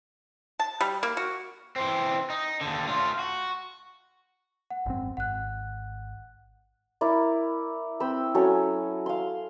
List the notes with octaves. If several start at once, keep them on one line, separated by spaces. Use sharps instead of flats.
A5
G3
A#3
F#4
E3 C4
D#4
D#2 D3
A3 F4
F#4
F#5
G#1 F#2 C4
G#1 F#5 F#6
E4 A#4 D5
C4 G5 B5 E6
F#3 C#4 A4 G#5
F5 C6